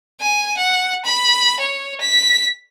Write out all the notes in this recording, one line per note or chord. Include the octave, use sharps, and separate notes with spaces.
G#5
F#5
B5
C#5
B6